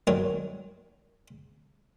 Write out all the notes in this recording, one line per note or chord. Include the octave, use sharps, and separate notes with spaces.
D#3 F#3 A#4 C#5